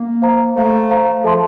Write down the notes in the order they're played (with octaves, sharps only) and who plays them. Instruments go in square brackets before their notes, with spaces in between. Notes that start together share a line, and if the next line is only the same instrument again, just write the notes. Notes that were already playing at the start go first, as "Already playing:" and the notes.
Already playing: [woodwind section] A#3
[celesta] C5 F5 A#5
[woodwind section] A3 [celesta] C5 F5 A#5
[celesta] C5 F5 A#5
[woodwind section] F3 [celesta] A4 E5 A5 C6